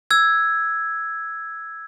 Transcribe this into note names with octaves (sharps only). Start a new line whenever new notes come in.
E6 G#6